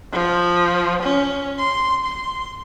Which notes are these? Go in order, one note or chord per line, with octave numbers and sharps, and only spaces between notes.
F3
C#4
C6
C6